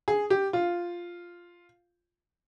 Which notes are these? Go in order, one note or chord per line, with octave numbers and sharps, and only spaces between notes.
G#4
G4
F4